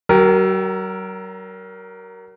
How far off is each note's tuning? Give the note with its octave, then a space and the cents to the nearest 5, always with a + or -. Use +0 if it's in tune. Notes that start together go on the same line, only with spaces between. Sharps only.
F#3 +40 A#4 +0 G5 +0